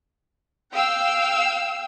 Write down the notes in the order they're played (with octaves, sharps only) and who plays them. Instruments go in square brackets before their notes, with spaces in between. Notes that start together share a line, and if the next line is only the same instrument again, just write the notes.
[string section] F5 G5 E6